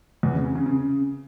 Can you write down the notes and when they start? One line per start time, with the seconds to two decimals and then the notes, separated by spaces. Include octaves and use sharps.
0.23 E2
0.34 C#3
0.45 C#3
0.55 C#3
0.66 C#3